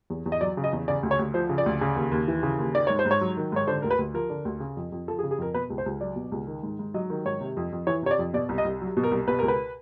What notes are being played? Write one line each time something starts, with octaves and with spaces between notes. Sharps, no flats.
E2
E2
D#5
F#3 D5
C#3
D#5
E2
C#3 D5
D2
C#5
D2
F3 C5
C#3
D5
D2
C#3
D#2
D#2
E3
C#3
D#2
D#3 D5
G#2 C#5
C5
G#2
C#5
F#3
D#3
G#2 C#5
D3 C5
D2 A#4
B4
D2
F3 A#4
D3
D2
C#3
F2
F2
F3 A4
G#4
C#3
G#4
F2 A#4
B2 B4
C#2
C5
C#2
F#3 D5
B2
C#2
D#3
G#2
G#2
F#3 D#5
D#3
G#2 C#5
C3
F2
F2
E3 C#5
C3 C#5
D5
F2
B2 D5
C2
D#5
C2
F#3
B2
A#4
C2
B2 B4
C#2 A#4
B4